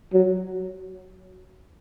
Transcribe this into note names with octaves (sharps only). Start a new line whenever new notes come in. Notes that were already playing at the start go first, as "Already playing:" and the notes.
F#3